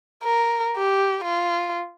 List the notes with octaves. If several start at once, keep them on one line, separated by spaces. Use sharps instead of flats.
A#4
G4
F4